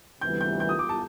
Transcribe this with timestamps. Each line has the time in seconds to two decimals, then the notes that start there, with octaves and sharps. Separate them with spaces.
0.21 D2 C3 E3 G3 B3 G6
0.41 G6
0.60 G6
0.69 D#6
0.79 D6
0.89 A5